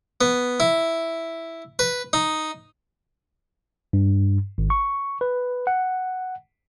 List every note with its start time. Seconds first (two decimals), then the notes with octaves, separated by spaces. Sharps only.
0.21 B3
0.60 E4
1.79 B4
2.13 D#4
3.93 G2
4.58 G#1
4.70 C#6
5.21 B4
5.67 F#5